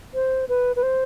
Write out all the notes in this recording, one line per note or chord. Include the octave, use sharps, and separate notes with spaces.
C5
B4
B4
C5